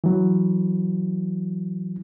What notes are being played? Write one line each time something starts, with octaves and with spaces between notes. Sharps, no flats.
E3 F#3